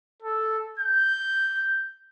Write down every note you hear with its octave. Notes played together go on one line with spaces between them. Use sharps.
A4
G6